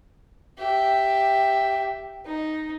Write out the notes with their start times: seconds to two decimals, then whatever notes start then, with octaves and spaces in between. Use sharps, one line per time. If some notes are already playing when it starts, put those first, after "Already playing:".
0.58 G4 E5
2.26 D#4